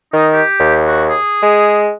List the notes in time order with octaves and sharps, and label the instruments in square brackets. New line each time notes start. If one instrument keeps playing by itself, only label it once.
[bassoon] D#3 [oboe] D#4
[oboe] G4
[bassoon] D#2
[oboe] F#4
G#4
[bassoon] G#3